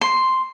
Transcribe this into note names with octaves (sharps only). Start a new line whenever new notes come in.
C6